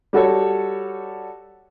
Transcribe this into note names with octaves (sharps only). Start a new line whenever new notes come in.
G3 F#4 A4 C#5